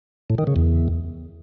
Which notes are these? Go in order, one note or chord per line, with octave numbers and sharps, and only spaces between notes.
A2
D#3
C#3
E2